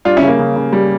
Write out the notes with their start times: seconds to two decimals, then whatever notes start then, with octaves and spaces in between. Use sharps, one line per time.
0.05 G3 D4 F4
0.17 C#4 E4
0.22 C#3
0.28 A#3
0.39 C#3
0.56 C#3
0.73 G3